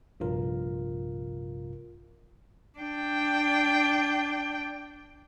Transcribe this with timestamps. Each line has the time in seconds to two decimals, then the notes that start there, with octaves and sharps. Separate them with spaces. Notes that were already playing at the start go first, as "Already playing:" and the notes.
0.20 A#1 G2 C3 F4 A#4
2.79 D4 G5